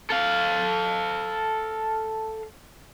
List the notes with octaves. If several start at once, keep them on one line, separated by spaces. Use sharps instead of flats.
A4 F5